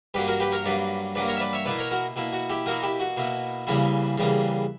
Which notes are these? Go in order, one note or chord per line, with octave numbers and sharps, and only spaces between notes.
G2 F#3 A#3 G4 B4
F#4 A#4
G4 B4
A#4 C#5
G2 F#3 A#3 B4 D5
G2 F#3 A#3 B4 D5
A#4 C#5
E5
B4 D5
C#5 E5
B2 A#3 E4 B4 D5
A#4 C#5
F#4 A#4
B2 A#3 E4
F#4
E4 G4
B2 A#3 E4 F#4 A#4
E4 G4
F#4
B2 A#3 E4
E2 C#3 E3 G3 A#3 E4
E2 C#3 E3 G3 A#3